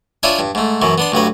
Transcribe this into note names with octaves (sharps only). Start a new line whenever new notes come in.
D4 E4 F4 C#5 E5 G#5
G2
G#2 A3
F#2 B2 E3
B3 D4 C6
D2 G2 F#3 B4